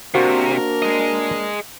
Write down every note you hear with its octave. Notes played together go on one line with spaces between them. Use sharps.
C3 A#3 D4 F#4 A#4 C5 F5
G#4 D#5